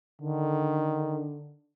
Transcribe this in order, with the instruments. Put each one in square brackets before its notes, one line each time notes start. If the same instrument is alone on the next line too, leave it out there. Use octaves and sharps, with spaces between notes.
[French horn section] D3 [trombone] D#3